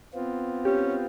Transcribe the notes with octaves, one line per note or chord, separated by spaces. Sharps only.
B3 C4 F4
C#4 G4